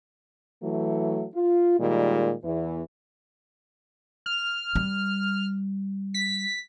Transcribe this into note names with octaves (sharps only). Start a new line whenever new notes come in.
E3 F#3 A3
F4
A#2 D#3 G3 G#3
E2 E3
F6
G3
B6